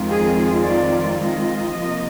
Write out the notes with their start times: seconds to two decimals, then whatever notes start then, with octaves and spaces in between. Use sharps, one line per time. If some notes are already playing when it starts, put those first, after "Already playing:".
Already playing: F2 D#3 G#3 C4 F4
0.13 G#4
0.68 D5
1.23 D#5
1.78 C3 F3 A#3 F4